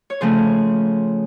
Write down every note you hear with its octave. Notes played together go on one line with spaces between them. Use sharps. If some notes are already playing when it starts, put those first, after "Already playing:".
C#5
C#3 F3 A3 C5